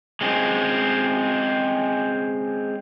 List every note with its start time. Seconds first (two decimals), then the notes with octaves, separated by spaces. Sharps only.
0.21 G#3 C4 C#4